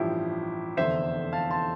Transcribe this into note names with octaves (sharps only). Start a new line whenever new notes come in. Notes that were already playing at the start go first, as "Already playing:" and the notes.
Already playing: A1 G2 F3 E4 G4
F1 E2 D3 C5 E5
F5 A5
A5 C6